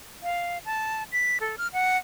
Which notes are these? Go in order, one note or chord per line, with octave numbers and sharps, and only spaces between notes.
F5
A5
B6
A4
F6
F#5